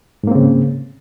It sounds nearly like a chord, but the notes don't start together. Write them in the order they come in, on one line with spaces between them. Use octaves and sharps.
G#2 A#3 C4 C#3